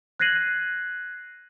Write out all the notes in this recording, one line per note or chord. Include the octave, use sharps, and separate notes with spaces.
F#6 G#6 A#6 C7 D#7 F#7